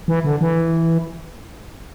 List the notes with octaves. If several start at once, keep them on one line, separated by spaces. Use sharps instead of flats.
E3
D3
E3